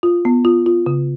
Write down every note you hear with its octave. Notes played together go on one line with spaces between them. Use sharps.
F4
B3
F4
F4
C#3